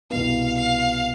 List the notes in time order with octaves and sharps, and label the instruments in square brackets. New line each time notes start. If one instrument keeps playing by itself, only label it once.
[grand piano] C2 B2 B3 [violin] F5
[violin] F5